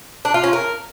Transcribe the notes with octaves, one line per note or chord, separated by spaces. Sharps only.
D4
F4
C#4
A#4